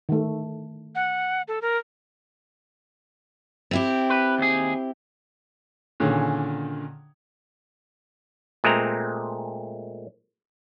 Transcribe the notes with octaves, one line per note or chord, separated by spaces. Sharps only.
D#3 A3
F#5
A4
A#4
C4 E4 G4
B4
D#2 G#4
A#2 D3 D#3 C#4 G#4
A#2 G#3 A3 C4 A#5